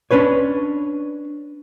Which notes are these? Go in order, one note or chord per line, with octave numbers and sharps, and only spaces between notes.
C#4 D4 B4 C#5